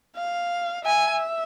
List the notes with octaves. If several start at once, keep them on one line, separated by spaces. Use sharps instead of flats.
F5
E5 G#5